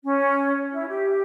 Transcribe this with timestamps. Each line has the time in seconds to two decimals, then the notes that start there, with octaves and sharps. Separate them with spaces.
0.03 C#4
0.72 E4
0.89 G4